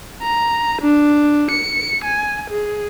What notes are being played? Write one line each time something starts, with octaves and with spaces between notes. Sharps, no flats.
A#5
D4
C#7
G#5
G#4